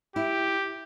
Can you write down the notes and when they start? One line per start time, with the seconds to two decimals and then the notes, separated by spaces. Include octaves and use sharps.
0.16 E4 G4